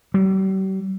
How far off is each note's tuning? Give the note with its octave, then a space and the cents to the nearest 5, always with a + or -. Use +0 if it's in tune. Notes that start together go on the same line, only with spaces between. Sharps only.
G3 -45